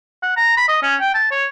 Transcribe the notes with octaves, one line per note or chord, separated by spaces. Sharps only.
F#5
A#5
B5
D#5
C#4
G5
A5
C#5